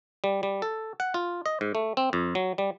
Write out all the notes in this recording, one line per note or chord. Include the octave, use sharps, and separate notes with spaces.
G3
G3
A4
F#5
F4
D#5
G#2
A3
C4
F2
F#3
G3